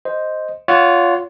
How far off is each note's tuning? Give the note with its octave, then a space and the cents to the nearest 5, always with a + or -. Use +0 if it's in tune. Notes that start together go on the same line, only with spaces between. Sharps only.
C5 +0 D#5 +0
F4 +0 C#5 +30 F#5 +0